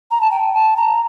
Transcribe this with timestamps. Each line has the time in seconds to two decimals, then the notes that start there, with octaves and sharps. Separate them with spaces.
0.11 A#5
0.21 A5
0.31 G5
0.54 A5
0.76 A#5